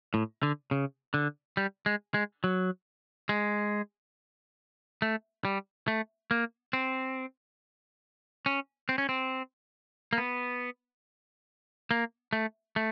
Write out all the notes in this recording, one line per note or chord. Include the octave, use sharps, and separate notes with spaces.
A2
D3
C#3
D3
G3
G#3
G#3
F#3
G#3
A3
G3
A3
A#3
C4
C#4
C4
C#4
C4
A#3
B3
A#3
A3
A3